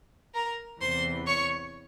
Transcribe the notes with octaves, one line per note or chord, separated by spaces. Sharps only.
A#4 A#5
E2 C3 E3 C5 C6
C#5 C#6